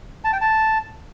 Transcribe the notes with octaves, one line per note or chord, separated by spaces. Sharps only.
A5
G5
A5